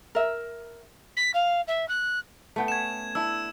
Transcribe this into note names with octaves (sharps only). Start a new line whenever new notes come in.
A#4 E5
B6
F5
E5
F#6
A3 B3 G5
C#4 G#6 E7
D4 E4 E6